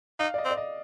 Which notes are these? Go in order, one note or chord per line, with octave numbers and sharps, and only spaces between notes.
D#4 F5
D5
D#5
C4
D5
D#5